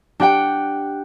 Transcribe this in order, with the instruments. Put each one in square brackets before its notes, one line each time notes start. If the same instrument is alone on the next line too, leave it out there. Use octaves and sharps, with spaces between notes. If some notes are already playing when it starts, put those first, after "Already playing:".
[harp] D4 G4 F#5 G5